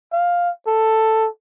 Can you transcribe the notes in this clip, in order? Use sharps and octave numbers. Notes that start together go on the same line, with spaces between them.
F5
A4